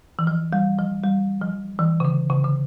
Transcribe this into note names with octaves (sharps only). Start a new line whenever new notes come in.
E3
F3
G3
F3
G3
F3
E3
C#3
D3
C#3
D3